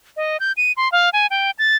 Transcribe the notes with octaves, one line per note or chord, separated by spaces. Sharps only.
D#5
G6
D#7
C6
F5
G#5
G5
A6